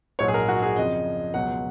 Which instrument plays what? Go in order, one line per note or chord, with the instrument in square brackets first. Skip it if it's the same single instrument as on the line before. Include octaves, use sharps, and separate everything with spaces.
[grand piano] A#1 G#2 F#3 C#5
G#4
A#4
F#4
G#4
F2 C#3 F3 D#5
C#2 B2 F#3 F#5